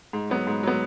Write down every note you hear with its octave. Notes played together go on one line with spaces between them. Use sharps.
G#2
F#3 B3
G#2
F#3 B3